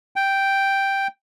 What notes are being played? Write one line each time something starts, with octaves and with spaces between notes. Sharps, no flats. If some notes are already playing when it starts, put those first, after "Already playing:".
G5